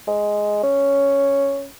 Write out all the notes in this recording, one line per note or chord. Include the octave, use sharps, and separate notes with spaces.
G#3
C#4